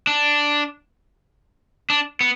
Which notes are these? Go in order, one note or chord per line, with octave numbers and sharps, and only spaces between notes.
D4
D4
B3